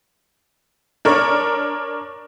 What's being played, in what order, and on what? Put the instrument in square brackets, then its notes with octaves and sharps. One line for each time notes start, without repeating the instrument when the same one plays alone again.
[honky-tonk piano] D4 A#4 C#5